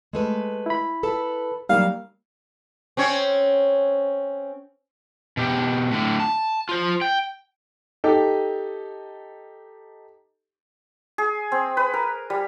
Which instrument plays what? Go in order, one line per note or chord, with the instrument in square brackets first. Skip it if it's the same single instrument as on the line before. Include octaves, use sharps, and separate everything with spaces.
[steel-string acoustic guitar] G#3 A3 B4
[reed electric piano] E4 B5
[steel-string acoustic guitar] A4 B4 A5
[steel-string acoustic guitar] F#3 D#4 [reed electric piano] G3 A#3 [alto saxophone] F5
[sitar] C4 C#4 C#5
[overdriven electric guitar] B2 G4
A2 D3
A5
F4 C5
G5
[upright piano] D#4 G4 A4
[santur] G#4
C4
B4
A#4
G3